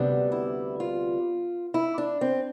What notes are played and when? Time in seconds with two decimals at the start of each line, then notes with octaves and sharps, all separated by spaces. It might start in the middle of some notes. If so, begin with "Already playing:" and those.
Already playing: D2 C3 G3 B3 D4
0.32 E4
0.80 F4
1.74 E4
1.98 D4
2.21 C4